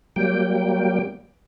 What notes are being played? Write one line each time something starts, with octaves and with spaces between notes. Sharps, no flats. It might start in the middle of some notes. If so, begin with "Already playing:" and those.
F#3 G3 A#3 G5